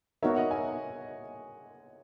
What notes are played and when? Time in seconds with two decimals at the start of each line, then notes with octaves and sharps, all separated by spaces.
0.22 B3 D#4 F#4 A#4 C#5 E5
0.36 D#5 F#5
0.51 E5 G#5